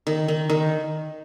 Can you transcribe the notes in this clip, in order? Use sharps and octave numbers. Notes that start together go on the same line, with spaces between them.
D#3
D#3
D#3